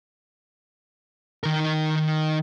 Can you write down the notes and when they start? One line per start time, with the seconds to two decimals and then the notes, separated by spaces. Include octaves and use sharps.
1.44 D#3 A#4